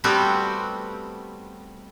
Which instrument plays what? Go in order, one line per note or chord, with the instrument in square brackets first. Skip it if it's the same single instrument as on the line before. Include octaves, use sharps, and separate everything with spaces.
[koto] G3 A3 B3 C4 F#4 G4